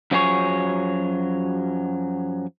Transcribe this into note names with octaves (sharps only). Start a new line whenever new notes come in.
F#2 F3 F#3 C4 G#4 C#5